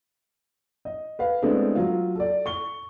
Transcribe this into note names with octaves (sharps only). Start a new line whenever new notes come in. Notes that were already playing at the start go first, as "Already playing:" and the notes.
D#5
B4 F5
G#3 A3 B3 C4 D4 E4
F#3 F4
A4 D5
C#6 G7